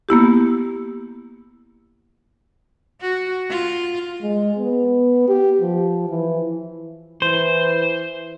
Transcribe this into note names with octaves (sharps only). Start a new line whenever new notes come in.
A#3 B3 E4 G4
F#4
F4
G#3
B3
G4
F3
E3
E3 C5